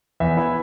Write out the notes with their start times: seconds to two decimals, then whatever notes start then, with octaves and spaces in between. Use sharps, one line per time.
0.20 E2 E5
0.37 E3 B3 E4